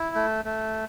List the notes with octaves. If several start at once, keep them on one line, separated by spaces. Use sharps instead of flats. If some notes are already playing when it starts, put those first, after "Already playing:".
Already playing: E4
A3
A3